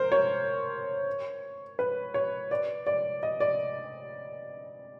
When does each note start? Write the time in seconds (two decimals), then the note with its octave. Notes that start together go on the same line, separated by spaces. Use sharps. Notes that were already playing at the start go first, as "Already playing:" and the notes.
Already playing: A#4 C5
0.12 C#5
1.79 B4
2.14 C#5
2.51 D5
2.87 D5
3.23 D#5
3.40 D5